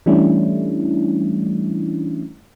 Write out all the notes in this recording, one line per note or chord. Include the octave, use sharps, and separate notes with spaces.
E3 G3 A3 C#4 D4 E4